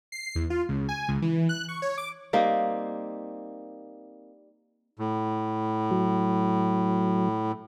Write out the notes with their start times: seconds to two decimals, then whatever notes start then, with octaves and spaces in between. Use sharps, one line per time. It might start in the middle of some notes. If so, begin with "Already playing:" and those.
0.12 C7
0.35 E2
0.50 F4
0.69 C#2
0.89 G#5
1.08 C#2
1.22 E3
1.49 F#6
1.69 C#6
1.82 C#5
1.98 D6
2.33 G3 A#3 C4 D#4
4.99 A2
5.91 F#3